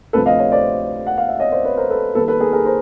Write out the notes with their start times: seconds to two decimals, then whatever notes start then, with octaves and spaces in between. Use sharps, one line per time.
0.13 D2 C3 F3 A4 B4
0.26 D#5 F5
0.39 C#5 D#5
0.51 C5 D5
1.07 F#5
1.18 F5
1.29 E5
1.40 C#5 D#5
1.52 C5 D5
1.65 B4 C#5
1.77 A#4 C5
1.90 A4 B4
2.15 D#2 D#3 G3 A4 B4
2.28 A4 B4
2.40 G#4 A#4
2.53 G#4 A#4
2.65 A#4 C5